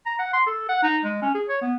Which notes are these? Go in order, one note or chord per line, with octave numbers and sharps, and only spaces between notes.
A#5
F#5
C6
A4
F#5
D#4
G#3
C#4
G#4
C#5
B3